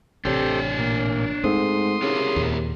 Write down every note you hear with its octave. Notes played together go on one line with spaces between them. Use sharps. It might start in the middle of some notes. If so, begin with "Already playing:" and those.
A1 C3 D4 G4 A4 C5 C#5
A#2
G#2 G#3 A3 C4 C6 D#6
C#3 E4 G4 A#4
D#2 A#2